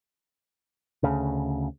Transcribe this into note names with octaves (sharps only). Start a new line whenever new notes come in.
D2 C#3